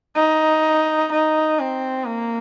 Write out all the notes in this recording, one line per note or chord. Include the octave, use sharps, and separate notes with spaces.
D#4
D#4
C4
A#3